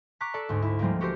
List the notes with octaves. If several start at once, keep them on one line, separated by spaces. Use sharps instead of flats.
A#5 C#6 D6 F#6 B6
A4 D5 A5
D2 G#2
E4
F3 G3 G#3 A#3
F#4 G4 A4 A#4 C5